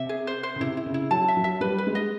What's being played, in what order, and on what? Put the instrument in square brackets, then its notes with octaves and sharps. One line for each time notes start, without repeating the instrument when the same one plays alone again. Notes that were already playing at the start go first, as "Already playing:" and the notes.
Already playing: [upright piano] C3 [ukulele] E5
[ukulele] G#4
C5
C5
[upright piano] C#3
[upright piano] C3 [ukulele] E4
[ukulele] E4
[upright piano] C#3
[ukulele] E4
[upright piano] F#3 [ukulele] A5
[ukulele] E5
[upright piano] F#3
[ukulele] E5
[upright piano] G3 [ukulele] B4
[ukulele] B4
[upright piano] G#3
[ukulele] D#5